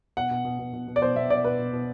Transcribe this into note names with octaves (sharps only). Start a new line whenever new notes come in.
B2 F#5
B2
B2
B2
B2
B2
D5
B2 C5
B2 E5
B2 D5
B2 B4
B2
B2